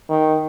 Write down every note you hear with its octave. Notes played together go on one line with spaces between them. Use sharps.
D#3